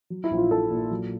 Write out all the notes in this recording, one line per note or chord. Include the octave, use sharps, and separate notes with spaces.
F#3
E4
A#1
F4
A#1 A4
A#2
F#3